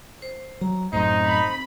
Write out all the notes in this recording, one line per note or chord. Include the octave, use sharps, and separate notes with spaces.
C5
F#3 A#5
F#2 A2 C4 D#4 C5
B5